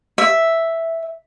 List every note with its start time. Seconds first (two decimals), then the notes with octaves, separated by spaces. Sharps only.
0.18 E5